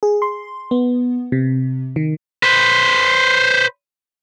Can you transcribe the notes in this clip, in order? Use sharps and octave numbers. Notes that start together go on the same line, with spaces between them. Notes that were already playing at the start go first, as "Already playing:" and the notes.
G#4
C6
B3
C3
D#3
B4 C5